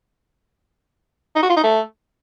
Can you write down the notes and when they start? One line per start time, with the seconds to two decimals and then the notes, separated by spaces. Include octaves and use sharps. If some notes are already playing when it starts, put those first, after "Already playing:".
1.36 D#4
1.43 F#4
1.49 F4
1.56 D#4
1.63 A3